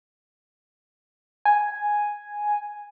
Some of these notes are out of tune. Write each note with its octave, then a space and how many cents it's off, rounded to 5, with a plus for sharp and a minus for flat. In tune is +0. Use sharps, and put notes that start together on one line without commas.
G#5 +0